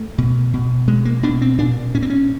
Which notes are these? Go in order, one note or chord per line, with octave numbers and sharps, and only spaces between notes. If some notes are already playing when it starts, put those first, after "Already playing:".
Already playing: A3
B2
B2
B2 G#3
A#3
B2 D4
C4
A#2 D4
A#2 C#4
C4
C#4